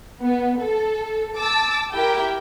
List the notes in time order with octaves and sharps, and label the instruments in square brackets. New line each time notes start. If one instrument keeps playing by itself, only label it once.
[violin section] B3
A4
A5 D6 E6 A6
E4 G4 A#4 G5